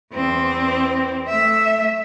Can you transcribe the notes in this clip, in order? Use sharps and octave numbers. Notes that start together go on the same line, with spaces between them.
E2 C4
A3 E5